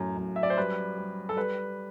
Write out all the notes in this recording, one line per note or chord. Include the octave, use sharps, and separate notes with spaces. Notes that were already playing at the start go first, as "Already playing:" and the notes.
Already playing: F#2 A2
F#2
E5
D5
C5
G3 B4
G3
A4
G3 B4